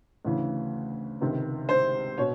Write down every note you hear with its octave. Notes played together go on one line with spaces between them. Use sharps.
D2 C#3 E3
C#2 C3 D#3
C5
B2 C#5